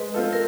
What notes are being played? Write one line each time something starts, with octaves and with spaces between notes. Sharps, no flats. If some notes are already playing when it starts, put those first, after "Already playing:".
Already playing: G#3 B4
C4 F4 A4
A#4